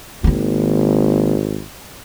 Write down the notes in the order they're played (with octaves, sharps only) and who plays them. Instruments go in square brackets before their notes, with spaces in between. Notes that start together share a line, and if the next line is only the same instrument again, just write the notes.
[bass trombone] G#1 [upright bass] D#3 A#3